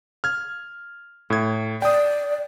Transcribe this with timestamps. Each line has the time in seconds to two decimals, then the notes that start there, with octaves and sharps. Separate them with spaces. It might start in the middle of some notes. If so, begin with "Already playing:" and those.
0.24 F6 G#6
1.30 A2 G#6
1.82 D5 G5 D#6